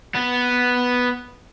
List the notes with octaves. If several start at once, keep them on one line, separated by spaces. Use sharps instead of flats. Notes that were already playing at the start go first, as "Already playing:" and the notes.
B3